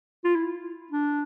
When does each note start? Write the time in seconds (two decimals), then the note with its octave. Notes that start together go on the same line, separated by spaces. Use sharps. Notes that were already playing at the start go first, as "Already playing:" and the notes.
0.24 F4
0.35 E4
0.91 D4